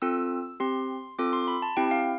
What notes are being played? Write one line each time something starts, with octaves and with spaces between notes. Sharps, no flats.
C4 F4 A4 E6
C4 G4 C6
C4 F4 A4 D6
C6
B5
A5
C4 E4 G4 G5
F5